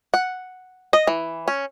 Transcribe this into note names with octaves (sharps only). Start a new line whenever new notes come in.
F#5
D#5
E3
C#4